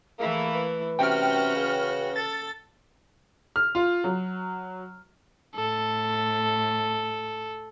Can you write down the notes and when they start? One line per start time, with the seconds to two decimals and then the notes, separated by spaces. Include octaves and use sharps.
0.19 E3 A3 A#3 E4 G#4
0.53 B4
0.99 C3 C#4 F#4 G5 F6
1.55 C#3
2.16 A4 A6
3.56 F6
3.75 F4
4.04 F#3
5.55 A2 A4